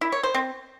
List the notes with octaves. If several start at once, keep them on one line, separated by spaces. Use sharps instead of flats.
E4
C#5
C5
C4